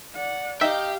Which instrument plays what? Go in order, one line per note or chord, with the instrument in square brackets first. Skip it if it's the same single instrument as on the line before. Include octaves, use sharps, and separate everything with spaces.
[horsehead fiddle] D5 F#5
[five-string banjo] D#4 [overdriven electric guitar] G4 G5 [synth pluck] E5 [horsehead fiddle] F5